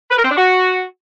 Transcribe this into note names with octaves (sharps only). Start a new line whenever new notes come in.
B4
A#4
C4
D4
F#4